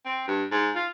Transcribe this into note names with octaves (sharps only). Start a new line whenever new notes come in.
C4
G2
G#2
F4